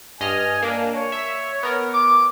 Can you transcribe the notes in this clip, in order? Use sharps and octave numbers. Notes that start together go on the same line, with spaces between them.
G2 D#5 G#5 F6
A#3 D4
C#5
E5
B3 A#4
D6